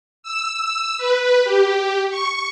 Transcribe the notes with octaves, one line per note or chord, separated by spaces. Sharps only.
E6
B4
G4
C#6